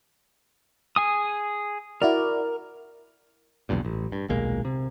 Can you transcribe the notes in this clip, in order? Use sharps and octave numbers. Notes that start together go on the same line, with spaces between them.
G#4 G#5 D#6
E4 F#4 A#4 D5
B1 E2 G2 A#2
A1
G2
D#1 B1 G#3 A#3
C3